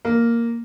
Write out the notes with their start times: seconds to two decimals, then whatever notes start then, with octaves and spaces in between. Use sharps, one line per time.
0.05 A#3